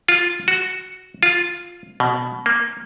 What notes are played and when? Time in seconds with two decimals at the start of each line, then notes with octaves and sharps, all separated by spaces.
0.09 F4
0.48 F#4
1.23 F4
2.00 B2
2.46 A#3